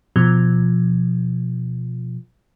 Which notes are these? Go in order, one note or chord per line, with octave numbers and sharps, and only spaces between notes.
B2 F3